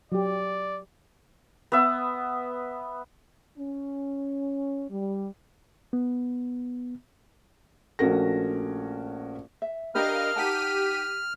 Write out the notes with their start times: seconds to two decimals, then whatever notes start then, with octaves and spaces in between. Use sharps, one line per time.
0.12 F#3 G4 D5
1.72 B3 E5
3.58 C#4
4.89 G3
5.93 B3
7.99 A#1 A3 C#4 F#4 A#4 A#6
9.62 E5
9.95 D4 G4 A#4 B4 D#5 F5 F6
10.36 D#4 G4 F#5 A5 B6 D#7